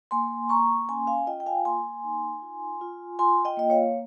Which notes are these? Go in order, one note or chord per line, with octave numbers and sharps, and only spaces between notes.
A#3 G#5 C6
A#3 A#5 C#6
C#4 G#5 C6
F5 G#5
F4 D#5 G5
G5
F5 G#5
A#3 G#5 C6
D#4
F4
F4
F4 G#5 C6
D#5 G5
A#3 D#5
C#5 F5